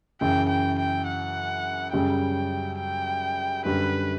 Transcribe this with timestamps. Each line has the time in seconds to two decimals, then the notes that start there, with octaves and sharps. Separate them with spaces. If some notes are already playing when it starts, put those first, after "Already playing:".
0.21 F#2 C#3 E3 G5
0.49 G5
0.78 G5
1.07 F#5
1.93 F#2 C#3 G3 G5
2.79 G5
3.65 F#2 D3 G3 B4